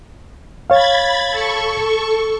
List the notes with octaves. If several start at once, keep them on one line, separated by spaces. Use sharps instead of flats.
C#5 F5 B5 G#6 A6
A4 C#6